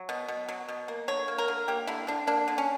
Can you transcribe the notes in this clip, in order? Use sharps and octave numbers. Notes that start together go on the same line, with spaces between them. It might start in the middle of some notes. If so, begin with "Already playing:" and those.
Already playing: F#3
B2
B2
F#3
B2
A#3
D3 C#5
A#3
A#4
D3
A#3 G4
D3 E4
D3 D4
A#3 D4
D3
C#4